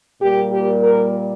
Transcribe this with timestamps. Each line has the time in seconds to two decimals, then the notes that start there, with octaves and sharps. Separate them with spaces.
0.21 A#2 G3 A#3 G4
0.52 G4
0.83 A#4